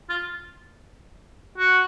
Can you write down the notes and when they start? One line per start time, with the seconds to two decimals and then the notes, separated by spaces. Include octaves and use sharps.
0.09 F4
1.58 F#4